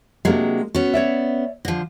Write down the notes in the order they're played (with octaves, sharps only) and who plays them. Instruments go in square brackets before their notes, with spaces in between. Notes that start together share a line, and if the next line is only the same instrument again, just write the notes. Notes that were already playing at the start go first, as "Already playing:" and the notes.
[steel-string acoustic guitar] C3 F#3 [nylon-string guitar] G#3 A#3 D4
[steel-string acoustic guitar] B3 C#4 [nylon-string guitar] F#4
[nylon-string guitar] C#5 D5 E5
[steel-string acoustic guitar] D3 F3